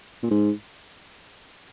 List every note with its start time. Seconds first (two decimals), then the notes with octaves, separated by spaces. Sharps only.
0.23 A#2
0.31 G#2